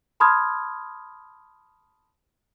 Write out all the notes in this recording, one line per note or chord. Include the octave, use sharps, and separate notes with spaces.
A5 B5 C6 D#6 F6 G#6